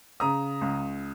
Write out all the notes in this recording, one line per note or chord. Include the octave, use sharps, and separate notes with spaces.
C#3 A#5 D#6
C#2